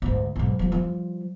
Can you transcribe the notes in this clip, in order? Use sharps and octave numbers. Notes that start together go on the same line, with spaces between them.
D2 G#2
B1 G#2
F3 G3
F3 G3